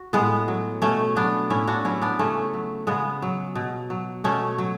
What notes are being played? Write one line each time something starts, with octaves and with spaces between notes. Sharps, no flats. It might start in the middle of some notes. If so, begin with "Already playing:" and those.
Already playing: F#4
A2 G#3 B3
F#3
B2 A3 C#4
F#3 B3 D4
A2 C#4 E4
D4 F#4
F#3 C#4 E4
B3 D4
C#3 A3 C#4
F#3
C#3 G#3 B3
F#3
B2
F#3
B2 A3 C#4
F#3